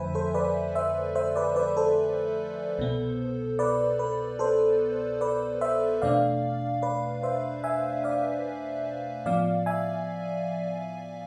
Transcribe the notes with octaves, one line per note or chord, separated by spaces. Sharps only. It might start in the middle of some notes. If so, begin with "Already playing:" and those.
Already playing: F2 D3 F3 A3 B4 C5 E5 G#5
A4 C5
B4 D5
C5 E5
C5 E5
B4 D5
B4 D5
A4 C5
C2 B2 B3
B4 D5
B4
A4 C5
B4 D5
C5 E5
E2 B2 A3 D4 D5 F5
B4 D5
C5 E5
E5 G#5
D5 F5
A2 F3 B3 D5 F5
E5 G#5